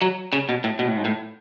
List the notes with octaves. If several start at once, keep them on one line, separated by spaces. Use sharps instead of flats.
F#3
C#3
B2
A2
B2
A2
G#2
A2